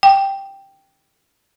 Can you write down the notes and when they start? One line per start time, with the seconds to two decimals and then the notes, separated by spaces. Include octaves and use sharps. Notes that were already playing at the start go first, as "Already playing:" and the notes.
0.03 G5